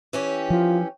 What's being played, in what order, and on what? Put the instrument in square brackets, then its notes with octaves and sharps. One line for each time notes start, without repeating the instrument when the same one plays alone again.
[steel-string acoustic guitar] E3 C#4 G4
[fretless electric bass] F3 [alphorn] F4